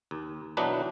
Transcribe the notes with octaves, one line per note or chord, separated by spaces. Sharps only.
D#2
B1 E3 F#3 D4 D#4 B4